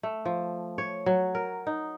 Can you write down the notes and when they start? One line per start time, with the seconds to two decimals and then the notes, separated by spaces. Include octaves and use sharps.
0.03 A3
0.25 F3
0.78 C#5
1.06 F#3
1.35 A#4
1.67 D#4